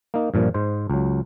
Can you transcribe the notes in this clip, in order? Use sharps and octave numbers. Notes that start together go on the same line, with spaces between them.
A#3 D#4
G2 A#2 F3
G#2 C5
C#2 F#3